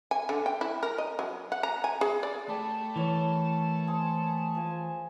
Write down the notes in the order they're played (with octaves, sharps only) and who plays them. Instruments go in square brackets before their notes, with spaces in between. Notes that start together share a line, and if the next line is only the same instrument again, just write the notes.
[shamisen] G#5
D3
G5
E4
A#4
D#5
F#3
F#5
A#5
G#5
G#4
D5
[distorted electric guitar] A3 [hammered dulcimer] G4 B5 [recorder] A5
[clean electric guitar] E3 [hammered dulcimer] A4 A#4 C#5
[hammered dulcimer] G#4 A4 C5
F3 G#5